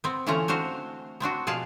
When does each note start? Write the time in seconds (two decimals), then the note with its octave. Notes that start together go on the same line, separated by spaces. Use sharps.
0.04 B3 C4
0.27 D3 E3 A3 C#4 F4 A#5
0.48 C4 D4 F#4 C5 F5
1.20 B3 C4 D4 F#4
1.47 B2 F3 G#4 D5 F5 A5